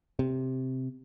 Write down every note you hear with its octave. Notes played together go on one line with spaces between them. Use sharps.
C3